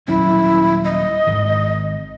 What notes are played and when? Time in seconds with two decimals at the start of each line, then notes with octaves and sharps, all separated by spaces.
0.08 D#1 F#3 C#4 E4
0.84 D#5
1.27 G#1 G#2 D#3